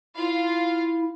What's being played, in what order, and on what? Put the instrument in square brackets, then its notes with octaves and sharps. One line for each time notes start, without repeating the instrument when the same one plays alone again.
[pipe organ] E4 [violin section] F4 F5